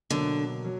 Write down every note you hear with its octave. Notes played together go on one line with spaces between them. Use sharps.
B2 D3 F#3 A#3
F#3